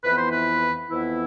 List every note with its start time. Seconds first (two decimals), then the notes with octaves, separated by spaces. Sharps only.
0.03 F2 E3 B3 E4 B4
0.18 C5
0.31 B4
0.90 F2 E3 B3 E4